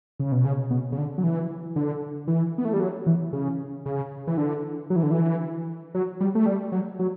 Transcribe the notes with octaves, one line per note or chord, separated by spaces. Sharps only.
C#3
B2
C#3
B2
C#3
D3
F#3
E3
D3
E3
B3
A3
G3
F#3
E3
C#3
C#3
E3
D3
F#3
E3
D3
E3
F#3
G3
A3
G3
F#3
F#3